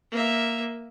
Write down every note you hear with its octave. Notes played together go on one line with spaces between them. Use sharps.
A#3 E5